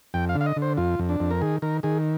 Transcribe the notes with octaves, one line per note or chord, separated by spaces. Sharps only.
F2 G5
F5
D3
F5
D#5
D3
C5
F2 F4
F2
D4
F2
A#4
D#3 G#4
D#3 A#4
D#3 G#4